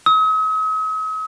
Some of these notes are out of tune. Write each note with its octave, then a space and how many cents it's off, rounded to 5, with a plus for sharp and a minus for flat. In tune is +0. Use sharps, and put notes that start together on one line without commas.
D#6 +45